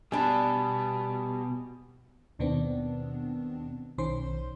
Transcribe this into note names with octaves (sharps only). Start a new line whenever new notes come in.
B2 G3 D4 G#5 A5 B5
D#2 B2 D#3 B3 C4 D4
B1 D#3 C#4 C5 C6